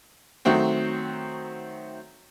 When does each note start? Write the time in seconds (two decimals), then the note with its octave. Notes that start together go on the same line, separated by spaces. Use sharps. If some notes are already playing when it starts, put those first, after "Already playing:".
0.45 D#3 F#3 A3 C4 F#4